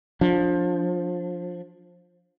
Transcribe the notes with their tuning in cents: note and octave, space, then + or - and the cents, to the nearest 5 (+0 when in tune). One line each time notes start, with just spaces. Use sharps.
F3 +20 D4 +0